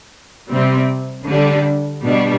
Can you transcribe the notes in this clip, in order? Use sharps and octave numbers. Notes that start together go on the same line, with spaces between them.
C3 G3 C4
D3 G3 D4
B2 G3 D4